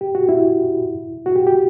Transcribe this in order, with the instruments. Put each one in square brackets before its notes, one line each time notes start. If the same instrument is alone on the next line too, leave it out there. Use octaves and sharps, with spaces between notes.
[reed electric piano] G4
F#4
E4
F#4
G4
G4